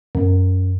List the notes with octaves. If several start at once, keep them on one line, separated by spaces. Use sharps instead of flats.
F#2